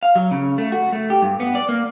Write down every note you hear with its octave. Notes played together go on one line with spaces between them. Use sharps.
F5
F#3
C#3
A3
F#4
A3
G4
G2
B3
D5
A#3